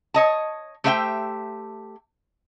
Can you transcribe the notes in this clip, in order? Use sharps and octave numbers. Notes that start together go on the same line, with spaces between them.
C#5 D#5 A5
A3 G4 C5 E5 F5 G5